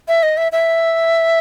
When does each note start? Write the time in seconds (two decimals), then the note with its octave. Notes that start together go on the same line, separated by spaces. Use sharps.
0.08 E5
0.23 D#5
0.37 E5
0.52 E5